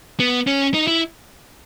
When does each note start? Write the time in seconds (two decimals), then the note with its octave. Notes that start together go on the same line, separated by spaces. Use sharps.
0.20 B3
0.47 C#4
0.74 D#4
0.87 E4